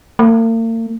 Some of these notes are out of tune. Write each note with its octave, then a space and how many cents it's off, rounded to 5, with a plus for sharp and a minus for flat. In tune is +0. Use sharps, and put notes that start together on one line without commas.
A#3 -45